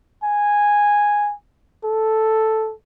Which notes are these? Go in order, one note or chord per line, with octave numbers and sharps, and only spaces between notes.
G#5
A4